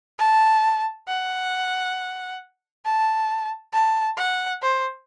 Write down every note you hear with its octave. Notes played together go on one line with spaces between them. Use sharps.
A5
F#5
A5
A5
F#5
C5